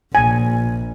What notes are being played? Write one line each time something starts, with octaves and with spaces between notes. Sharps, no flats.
A#1 G#5